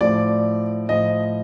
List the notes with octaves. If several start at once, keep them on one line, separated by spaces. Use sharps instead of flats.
A2 F3 D5
A2 F3 D#5